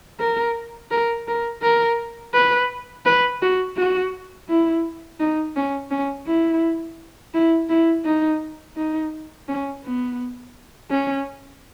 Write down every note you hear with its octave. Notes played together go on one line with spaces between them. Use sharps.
A#4
A#4
A#4
A#4
B4
B4
F#4
F#4
E4
D#4
C#4
C#4
E4
E4
E4
D#4
D#4
C#4
B3
C#4